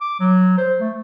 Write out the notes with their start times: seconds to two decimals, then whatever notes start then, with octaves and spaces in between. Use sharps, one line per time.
0.01 D6
0.20 F#3
0.58 C5
0.80 A3